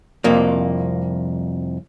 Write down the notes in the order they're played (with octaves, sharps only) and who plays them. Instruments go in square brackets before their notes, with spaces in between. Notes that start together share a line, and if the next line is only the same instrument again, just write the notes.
[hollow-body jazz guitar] C2 F2 A#3